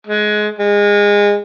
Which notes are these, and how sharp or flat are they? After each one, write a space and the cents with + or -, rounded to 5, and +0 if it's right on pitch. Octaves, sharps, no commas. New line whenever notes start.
G#3 +20
G#3 -25